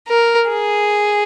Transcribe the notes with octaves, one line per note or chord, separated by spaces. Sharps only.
A#4
G#4